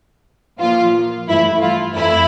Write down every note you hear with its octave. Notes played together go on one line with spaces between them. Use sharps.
A#2 F3 A#3 F4
G2 E3 A3 E4
F4
F2 E3 A3 E4